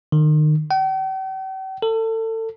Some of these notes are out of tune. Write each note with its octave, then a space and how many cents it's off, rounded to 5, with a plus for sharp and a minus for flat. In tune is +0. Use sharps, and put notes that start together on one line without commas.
D#3 -35
G5 -45
A4 +30